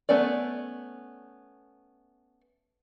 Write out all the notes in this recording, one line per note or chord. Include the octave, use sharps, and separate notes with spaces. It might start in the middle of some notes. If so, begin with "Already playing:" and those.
A3 B3 C#4 D5